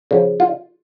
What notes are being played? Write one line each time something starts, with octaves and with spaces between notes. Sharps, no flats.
C#3 F3
F4